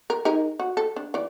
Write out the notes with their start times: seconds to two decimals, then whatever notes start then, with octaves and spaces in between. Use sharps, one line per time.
0.10 A#4
0.25 D#4 G#4 A#4
0.60 F#4
0.77 A4
0.96 D4
1.14 E3 D5